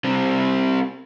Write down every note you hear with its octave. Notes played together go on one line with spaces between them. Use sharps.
G3 C4